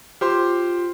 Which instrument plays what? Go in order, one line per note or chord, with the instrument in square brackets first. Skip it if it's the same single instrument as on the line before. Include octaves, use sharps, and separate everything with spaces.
[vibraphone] F4 [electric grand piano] G4 C5 C6